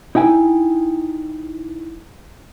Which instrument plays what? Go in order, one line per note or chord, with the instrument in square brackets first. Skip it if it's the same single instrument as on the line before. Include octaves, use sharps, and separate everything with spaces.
[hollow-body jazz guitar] D#4 E4 G5 G#5